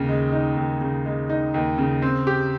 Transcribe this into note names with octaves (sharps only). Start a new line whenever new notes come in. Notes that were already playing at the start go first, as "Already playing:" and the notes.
Already playing: D#2 C#3
G#3
D#4
D#2
C#3
G#3
D#4
D#2
C#3
C4
G4